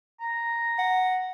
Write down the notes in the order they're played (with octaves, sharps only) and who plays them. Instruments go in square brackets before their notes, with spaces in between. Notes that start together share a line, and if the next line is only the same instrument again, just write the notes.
[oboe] A#5
[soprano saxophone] F#5